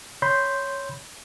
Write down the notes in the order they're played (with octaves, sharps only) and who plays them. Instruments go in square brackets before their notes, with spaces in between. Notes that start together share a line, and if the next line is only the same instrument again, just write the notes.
[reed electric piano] C#5 B5 C6 G6